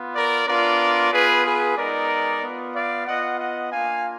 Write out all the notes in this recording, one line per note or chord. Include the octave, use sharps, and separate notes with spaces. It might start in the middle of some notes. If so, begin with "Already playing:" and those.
Already playing: B3 F4
A#4 D5
B3 D4 F4 A#4 D5
B3 F4 G#4 B4
G#4 B4
G#3 B3 D#4 A#4 D5
B3 F4
D5 F5
B3 F4 D#5 F#5
D#5 F#5
A#3 D4 F4 F5 G#5